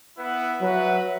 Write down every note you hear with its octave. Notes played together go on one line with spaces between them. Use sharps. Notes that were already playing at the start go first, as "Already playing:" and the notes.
B3 E4 B4 F#5
F#3 F#4 B4 E5